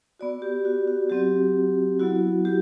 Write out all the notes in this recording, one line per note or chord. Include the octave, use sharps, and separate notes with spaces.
B3 F#4 D5
G4
F#4
F#4
F#3 C4 F#4 G4
F#3 B3 E4 F#4
G4